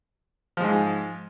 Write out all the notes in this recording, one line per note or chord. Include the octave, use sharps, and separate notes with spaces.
G#2 F3 G#3